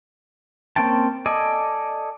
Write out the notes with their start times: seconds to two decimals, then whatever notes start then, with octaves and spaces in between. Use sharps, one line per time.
0.76 A#3 C4 C#4 G5 A5
1.26 A4 D5 D#5 G#5